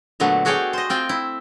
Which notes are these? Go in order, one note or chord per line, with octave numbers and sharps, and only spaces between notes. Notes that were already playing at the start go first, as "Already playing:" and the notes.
A#2 D3 F#3 A3 B3
A3 F#4 G#4 C#5 D5 G5
C5 D#5
C4 F4 G5
E4